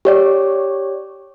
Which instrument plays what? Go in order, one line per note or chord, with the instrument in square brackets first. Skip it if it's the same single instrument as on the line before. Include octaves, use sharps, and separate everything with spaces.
[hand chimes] G4 C#5 D5